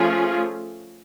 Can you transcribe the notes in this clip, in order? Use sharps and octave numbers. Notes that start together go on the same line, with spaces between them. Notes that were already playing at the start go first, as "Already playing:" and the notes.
Already playing: F3 A3 C#4 F4 G#4